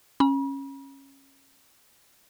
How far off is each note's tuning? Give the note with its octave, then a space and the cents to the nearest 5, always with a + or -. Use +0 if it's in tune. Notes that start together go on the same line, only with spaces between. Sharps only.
C#4 -20 B5 -45